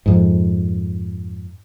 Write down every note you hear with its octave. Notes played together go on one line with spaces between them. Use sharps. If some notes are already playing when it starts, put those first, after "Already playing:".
F2 G#2